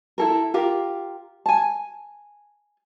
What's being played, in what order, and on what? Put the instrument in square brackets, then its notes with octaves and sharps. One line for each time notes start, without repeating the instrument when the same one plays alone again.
[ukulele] E4 A4 A#4
F4 G4 A#4
G#5 A5